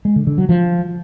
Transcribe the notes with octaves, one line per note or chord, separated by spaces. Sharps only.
G#3
D3
D3
F#3
F3